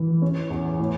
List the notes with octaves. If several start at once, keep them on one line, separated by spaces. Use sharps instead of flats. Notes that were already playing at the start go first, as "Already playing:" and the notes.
Already playing: E3
C#4
E2
A2